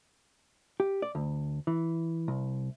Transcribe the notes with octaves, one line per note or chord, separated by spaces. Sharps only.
G4
D5
D2
E3
C2